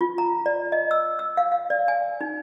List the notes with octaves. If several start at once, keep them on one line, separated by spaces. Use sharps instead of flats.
F4
A#5
D5
D#5
E6
E6
F5
F5
D5
G#5
D#4